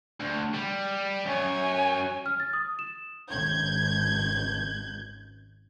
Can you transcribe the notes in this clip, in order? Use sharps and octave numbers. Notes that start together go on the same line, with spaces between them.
D2
G3
F#2 C#5 G#5
F6
A6
D#6
E7
G#1 C#2 G6 G#6